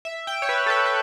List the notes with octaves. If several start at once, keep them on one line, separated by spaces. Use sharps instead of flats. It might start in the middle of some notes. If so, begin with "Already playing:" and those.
E5
G5
C#5
B4
A4
B4
B4